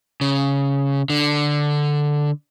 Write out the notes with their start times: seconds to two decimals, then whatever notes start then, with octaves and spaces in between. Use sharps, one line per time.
0.21 C#3
1.10 D3